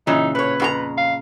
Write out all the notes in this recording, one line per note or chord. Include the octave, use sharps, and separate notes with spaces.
A#2 C#3 E3 D#4
A2 B4 C#5
F2 F#4 A#5
F5